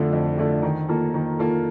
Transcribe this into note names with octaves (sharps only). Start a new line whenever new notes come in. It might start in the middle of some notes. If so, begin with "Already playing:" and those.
Already playing: F2 D3 A3 D4 F4
F2
D3 A3 D4 F4
D#3
A#3 F4 A4
D#3
A#3 F4 A4